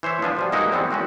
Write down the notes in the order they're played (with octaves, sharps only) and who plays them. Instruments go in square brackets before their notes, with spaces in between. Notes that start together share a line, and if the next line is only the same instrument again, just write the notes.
[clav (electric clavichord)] E3 C5 C#5 E5
F3 B3 D4 G#5
B2 F3 G3
G#3 A#3 D#4 E4 F#4 G4
D#3 E3 G3 B3 C4
G#3 C4 C#4 F#4